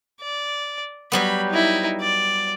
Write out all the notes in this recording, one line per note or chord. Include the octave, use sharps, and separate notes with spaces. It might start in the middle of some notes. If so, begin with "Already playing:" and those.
D5
F#3 G3 B3 B5
D#4 E4
D5